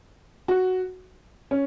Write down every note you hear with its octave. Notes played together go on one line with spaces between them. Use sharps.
F#4
C#4